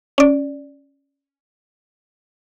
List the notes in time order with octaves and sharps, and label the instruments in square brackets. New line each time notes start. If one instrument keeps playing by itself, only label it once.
[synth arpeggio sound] C#4 D5